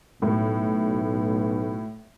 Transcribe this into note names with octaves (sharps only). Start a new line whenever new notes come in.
B1 A2